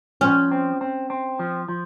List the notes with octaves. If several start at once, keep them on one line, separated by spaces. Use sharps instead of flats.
F3 C#4
C4
C4
C4
F3
F3